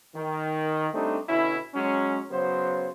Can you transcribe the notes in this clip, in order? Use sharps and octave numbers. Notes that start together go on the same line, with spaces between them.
D#3
G3 A3 C4 D4 D#4
B2 D3 C#4 E4
F#3 G#3 C#4
C#3 F#3 B3 C5